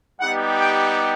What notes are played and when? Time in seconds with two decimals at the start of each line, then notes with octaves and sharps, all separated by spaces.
0.20 G3 B3 D#4 G4 F#5
0.58 G5